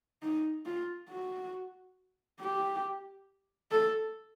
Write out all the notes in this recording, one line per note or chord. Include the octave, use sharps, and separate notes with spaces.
D#4
F4
F#4
G4
A4